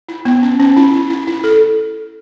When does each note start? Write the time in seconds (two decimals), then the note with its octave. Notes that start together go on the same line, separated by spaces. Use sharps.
0.09 E4
0.25 B3
0.43 C#4
0.60 C#4
0.77 E4
0.93 E4
1.10 E4
1.27 E4
1.44 A4